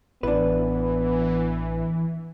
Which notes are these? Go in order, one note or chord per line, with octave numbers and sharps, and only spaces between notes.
A1 E3 B3 D4 B4